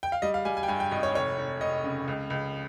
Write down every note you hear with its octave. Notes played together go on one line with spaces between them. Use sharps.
G5
F5
G3 D#5
F5
G3 G#5
G#5
G5
G2 G#5
G5
G#1 D#5
C#5
F1 C#5
F1
F1 D#5
C#3
C#2
C#2